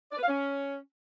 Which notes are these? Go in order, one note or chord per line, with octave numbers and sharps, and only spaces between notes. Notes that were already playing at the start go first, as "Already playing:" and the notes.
D5
B4
F5
C#4